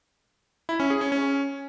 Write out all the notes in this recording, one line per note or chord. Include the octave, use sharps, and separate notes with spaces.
E4
C#4
G#4
C#4
C#4